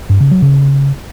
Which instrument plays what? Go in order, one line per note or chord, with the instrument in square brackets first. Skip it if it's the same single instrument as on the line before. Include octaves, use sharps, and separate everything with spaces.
[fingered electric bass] G2
C#3
F#3
C#3